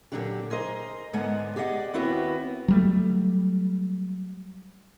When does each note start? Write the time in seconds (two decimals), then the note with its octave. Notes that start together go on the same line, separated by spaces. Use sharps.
0.12 A#2 D3 D#3 F#3 D4 G4
0.50 G#4 A#4 C5 D#5
1.13 G#2 D3 G#3 B3 F#5 G#5
1.56 G4 G#4 D5 D#5 F#5
1.94 D#2 B3 C4 E4 F#4 B4
2.68 F#3 G3 A3